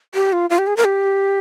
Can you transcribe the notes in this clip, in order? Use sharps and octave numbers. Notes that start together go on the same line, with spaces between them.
G4
F4
F4
G4
G#4
A#4
G4